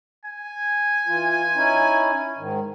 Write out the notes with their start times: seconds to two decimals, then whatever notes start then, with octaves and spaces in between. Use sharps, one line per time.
0.25 G#5
1.07 E3 F4
1.55 C#4 D#4 E4
2.37 G#2 D#3